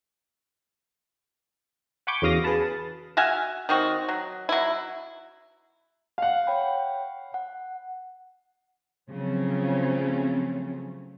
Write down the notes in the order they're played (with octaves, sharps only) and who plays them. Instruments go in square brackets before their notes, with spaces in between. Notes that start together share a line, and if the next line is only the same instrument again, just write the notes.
[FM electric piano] F#5 G#5 B5 C#6 D6 G6
E2 C#3 F#4 F5 D#6 A#6
G#4 B4 F5 A5 B5
[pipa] F#4 E5 F5 G#5
D#3 C4 F#4
F#3
F#3 E4
[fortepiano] F5 F#5
[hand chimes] C#5 G5 B5
F#5
[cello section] C#3 F3 F#3 A3 C4 C#4